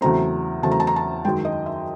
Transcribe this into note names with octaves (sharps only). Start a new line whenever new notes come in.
E2 C#3 F#3 A3 C4 A#5
E2 C#3 F#3 A3 C4 A5
A#5
A5
A#5
A5
F#2 D#3 G#3 G5
D#5
E5